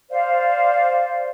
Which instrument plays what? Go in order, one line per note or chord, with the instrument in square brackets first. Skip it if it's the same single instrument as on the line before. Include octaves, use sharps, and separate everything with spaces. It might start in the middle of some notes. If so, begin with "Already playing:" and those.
[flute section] C5 D5 F5